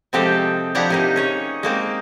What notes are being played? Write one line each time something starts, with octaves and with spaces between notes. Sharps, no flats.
C3 F3 G#3 C4 G4 A4
F3 D4 E4 G4 F#5 A#5
C3 A#3 D#4
C#4 G#4 C#5
G#3 A#3 C4